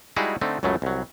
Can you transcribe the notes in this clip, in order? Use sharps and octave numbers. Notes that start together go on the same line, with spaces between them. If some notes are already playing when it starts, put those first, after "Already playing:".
G3 G#3 D#4 E4 F#4 G#4
D3 A3 C4 D#4
C#2 F#2 C#3 F#3 A3
C2 F#3